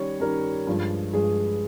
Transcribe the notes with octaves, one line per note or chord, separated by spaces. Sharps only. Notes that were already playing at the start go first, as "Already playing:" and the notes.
Already playing: D#3 G3 C#4 C#5
D#3 G3 C#4 A#4
G2 F3 G#3
G2 F3 G#3 G#4